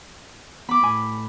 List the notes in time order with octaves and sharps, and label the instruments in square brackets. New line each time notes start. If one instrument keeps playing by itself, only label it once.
[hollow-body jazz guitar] B3 [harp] B5 D6
[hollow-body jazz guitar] A2 G#5